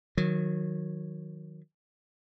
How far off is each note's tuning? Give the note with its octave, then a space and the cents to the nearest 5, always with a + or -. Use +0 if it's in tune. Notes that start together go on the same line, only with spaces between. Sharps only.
D#3 +0 F#3 -20